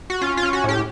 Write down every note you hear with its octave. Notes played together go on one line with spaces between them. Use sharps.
F#4
C#4 F4
F4
C#4
F#4
A2 G4